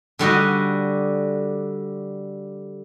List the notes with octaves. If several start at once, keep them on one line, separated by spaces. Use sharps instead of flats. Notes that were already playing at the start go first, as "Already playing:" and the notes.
D3 G3 F#4 D#5